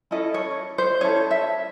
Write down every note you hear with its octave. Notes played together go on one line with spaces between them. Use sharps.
C#4 E4 A4 D#5
C#5
C5
C#4 E4 A4 C#5
E5